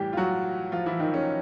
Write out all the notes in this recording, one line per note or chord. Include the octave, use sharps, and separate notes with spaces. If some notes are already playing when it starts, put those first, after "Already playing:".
Already playing: A2 E3 G3 G4
F4
F#3 F#4
F3 F4
E3 E4
D#3 D#4
C#4